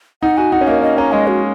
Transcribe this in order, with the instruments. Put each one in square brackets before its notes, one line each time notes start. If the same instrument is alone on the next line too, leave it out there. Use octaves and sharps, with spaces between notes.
[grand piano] D#4 [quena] F#5
[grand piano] F#4 [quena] G#5
[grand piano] D#4 [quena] F#5
[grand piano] C#4
[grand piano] A#3 [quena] D#5
[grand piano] C#4 [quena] D#5
[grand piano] C#4 [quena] A#5
[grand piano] G#3 [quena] D#5
[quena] F#4